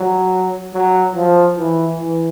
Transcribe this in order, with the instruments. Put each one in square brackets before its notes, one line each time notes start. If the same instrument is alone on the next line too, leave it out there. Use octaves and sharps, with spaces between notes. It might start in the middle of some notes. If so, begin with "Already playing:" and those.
Already playing: [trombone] F#3
F#3
F3
E3
E3